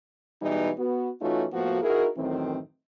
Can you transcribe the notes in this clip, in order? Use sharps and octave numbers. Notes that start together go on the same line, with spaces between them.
B2 E3 G3 G#3 D#4 E4
B3 F#4
E3 A3 C#4 D#4 F4 F#4
A2 F3 A#3 B3 F#4
D#4 E4 F#4 G#4 A#4
F#2 A2 D#3 E3 C4